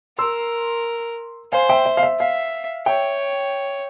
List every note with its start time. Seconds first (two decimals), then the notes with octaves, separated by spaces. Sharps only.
0.18 A#4 C6 E6
1.52 C5 F5 G#5
1.69 E5 G5
1.86 E5
1.97 F5
2.03 E5
2.19 E5 F5
2.86 C#5 E5 G5